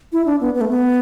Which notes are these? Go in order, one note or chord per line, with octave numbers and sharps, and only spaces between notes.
E4
D4
B3
B3
A3
B3